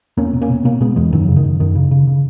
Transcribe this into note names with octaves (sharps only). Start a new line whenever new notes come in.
E2 A#3 C#4
B2
A#3 C#4
B2
B2 A#3 C#4
B2 G#3 B3
E2 E3 G#3
F#2 D#3 F#3
C#3
D#3
F#2
F#2 D#3
C#3
C#3
C#3